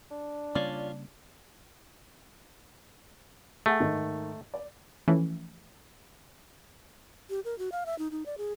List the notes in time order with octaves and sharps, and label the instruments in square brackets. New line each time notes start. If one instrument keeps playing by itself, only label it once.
[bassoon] D4
[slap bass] C#3 G3 A#3 [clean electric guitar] C#4 F4 C#5 [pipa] D5
[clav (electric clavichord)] A3 [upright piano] G#4 A4 F#5
[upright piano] G#2 D#3
D5
[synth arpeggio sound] E3 F3 A3 C#4 E4
[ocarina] G4
A#4
F#4
F5
E5
D#4
D#4
D5
G#4